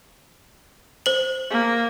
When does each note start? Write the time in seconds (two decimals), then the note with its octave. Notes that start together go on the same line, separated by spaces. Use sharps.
1.06 C5 F#7
1.50 A#3